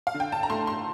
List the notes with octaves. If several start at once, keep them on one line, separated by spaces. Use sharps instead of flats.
F5
D3
G5
A5
A#5
A3 C6
C6